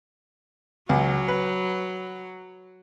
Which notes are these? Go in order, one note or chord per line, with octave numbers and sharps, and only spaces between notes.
C#2 F#3
B4